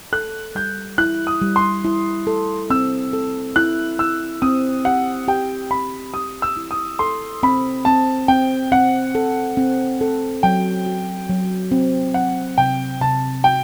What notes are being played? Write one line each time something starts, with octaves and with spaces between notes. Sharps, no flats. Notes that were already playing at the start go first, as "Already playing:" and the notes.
A4 F#6
G3 G6
E4 F#6
D#6
G3
C6
E4
A4
C4 E6
A4
E4 F#6
E4 E6
C4 D#6
G4 F#5
G4 G5
C4 B5
G4 D#6
E6
E4
D#6
A4 C6
C4 B5
C4 A5
C4 G5
C4 F#5
A4
C4
A4
F#3 G5
F#4
F#3
C4
F#3 F#5
C3 G5
C3 A5
F#4 G5